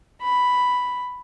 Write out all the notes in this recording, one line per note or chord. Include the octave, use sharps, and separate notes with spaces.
B5